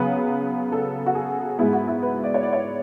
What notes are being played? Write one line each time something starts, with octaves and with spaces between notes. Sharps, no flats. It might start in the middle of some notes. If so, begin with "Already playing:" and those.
Already playing: C#3 F#3 B3 B4
A4
F#4
G#4
G#2 G#3 B3 E4
F#4
E4
B4
D5
C#5
D5
C#5